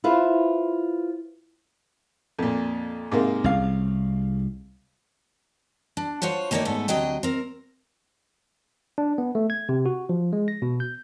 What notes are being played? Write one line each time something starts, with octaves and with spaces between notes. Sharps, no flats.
E4 F4 B4 C5
F2 A#2
G#2 C3 A#3
C2 C#3 F5
D4
F4 F#4 C5 C#5 F#5
D#3 A3 A#3 D#4 C#5 D5
G#2 A3 B3 A4
D2 C3 F#3 D#5 G5
C4 A#4
D4
B3
A3
G#6
C3
F#4
F3
G#3
A#6
B2
G6